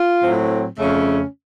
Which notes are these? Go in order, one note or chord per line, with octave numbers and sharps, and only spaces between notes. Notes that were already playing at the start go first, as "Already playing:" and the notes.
Already playing: F4
A2 F#3 C4
F2 C#3 A3 C#4